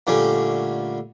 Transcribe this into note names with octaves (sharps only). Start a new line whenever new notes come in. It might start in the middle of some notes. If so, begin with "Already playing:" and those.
A#2 D3 G3 A3 C#4